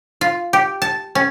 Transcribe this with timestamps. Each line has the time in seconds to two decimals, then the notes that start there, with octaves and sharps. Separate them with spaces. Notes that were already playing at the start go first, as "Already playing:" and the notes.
0.21 F4
0.53 G4
0.82 A5
1.15 C#4